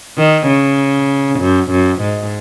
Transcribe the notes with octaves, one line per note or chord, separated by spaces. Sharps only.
D#3
C#3
F#2
F#2
G#2